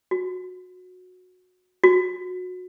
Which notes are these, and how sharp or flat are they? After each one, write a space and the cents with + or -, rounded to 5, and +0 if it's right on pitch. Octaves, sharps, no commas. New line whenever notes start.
F#4 -20
F#4 -25